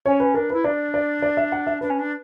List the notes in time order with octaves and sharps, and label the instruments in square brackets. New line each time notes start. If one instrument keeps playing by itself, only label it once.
[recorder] C#4 [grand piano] C#5
[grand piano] B4
[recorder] D4 [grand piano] A#4
[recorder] E4 [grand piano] B4
[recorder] D4 [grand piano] D5
[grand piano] D5
D5
E5
F#5
E5
[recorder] D4 [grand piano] B4
[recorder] C#4
D4